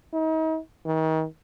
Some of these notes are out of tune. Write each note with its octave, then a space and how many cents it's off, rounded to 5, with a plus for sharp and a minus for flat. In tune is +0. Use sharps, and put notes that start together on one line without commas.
D#4 +40
D#3 +35